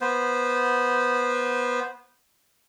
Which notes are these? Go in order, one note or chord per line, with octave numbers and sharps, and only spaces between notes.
B3 C5